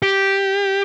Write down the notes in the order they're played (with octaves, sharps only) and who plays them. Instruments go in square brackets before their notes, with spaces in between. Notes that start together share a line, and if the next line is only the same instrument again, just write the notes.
[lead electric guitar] G4